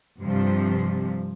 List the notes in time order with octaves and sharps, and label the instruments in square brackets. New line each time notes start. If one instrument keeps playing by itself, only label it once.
[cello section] G2 C3 F3